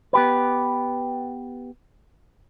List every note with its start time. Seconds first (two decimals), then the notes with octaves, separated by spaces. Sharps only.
0.13 B3 G4 B4